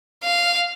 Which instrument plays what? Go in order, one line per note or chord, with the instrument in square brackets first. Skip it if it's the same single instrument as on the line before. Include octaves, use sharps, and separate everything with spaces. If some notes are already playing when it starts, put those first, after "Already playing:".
[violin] F5